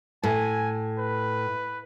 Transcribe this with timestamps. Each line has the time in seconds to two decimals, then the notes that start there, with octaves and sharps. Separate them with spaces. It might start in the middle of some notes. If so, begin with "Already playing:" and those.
0.24 A2 G#5
0.99 B4